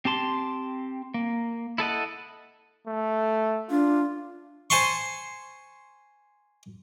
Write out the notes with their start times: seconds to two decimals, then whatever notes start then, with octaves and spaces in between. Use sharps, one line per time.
0.05 C4 G4 A5 C6
1.14 A#3
1.78 E4 A4 D#5 F#5
2.87 A3
3.70 D4 F4
4.70 C5 G#5 A5 C6 C#6